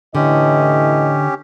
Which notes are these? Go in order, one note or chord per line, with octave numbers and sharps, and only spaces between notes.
A2 D3 E3 C#4 G4 D#5